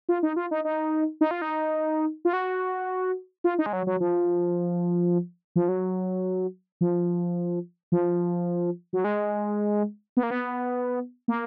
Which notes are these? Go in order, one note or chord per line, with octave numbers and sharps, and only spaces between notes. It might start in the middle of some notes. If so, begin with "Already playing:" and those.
F4
D#4
F4
D#4
D#4
D#4
F4
D#4
F4
F#4
F4
D#4
G#3
F#3
F#3
F3
F3
F#3
F3
F3
F#3
G#3
B3
A#3
B3
A#3